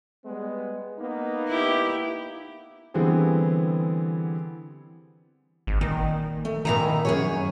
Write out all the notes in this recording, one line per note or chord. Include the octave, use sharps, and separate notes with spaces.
G3 G#3 B3
A#3 B3 D#4
E4 G4
D3 E3 G3 B3 C4 G#4
G#1
A#2 D#3
A3
A#2 D#3 E4 A#5
F#2 G#4 C#5